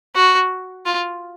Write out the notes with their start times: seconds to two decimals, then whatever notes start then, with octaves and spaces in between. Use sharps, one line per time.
0.15 F#4
0.86 F4